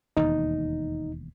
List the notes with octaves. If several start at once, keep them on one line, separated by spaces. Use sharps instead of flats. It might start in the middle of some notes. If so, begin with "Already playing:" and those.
E1 D#2 D#4